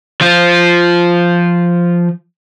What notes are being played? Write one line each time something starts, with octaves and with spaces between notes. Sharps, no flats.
F3 F4